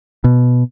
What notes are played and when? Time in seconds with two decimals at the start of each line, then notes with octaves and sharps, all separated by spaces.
0.24 B2